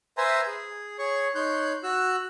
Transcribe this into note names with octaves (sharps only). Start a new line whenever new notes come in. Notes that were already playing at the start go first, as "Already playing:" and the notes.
B4 C5 E5 G#5 A#5 C6
G#4
G#4 C#5 C#6
D#4 C#5 C6 F#6 G6
F#4 E6 F#6